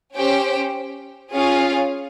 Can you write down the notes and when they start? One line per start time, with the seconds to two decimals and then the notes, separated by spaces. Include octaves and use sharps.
0.16 C#4 G4 C5 G5
1.33 C#4 F4 G#4 C#5 F5